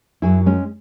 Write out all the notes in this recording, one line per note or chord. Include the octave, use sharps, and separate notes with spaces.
F#2 F#3 E4 G#4
G#3 C#4